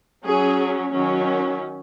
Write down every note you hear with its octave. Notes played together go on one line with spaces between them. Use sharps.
F#3 C#4 G#4
D#3 F#3 C#4